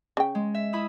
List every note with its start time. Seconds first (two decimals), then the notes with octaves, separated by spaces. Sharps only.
0.17 C#3 G5
0.35 G#3
0.54 E5
0.73 E4 B5 D#6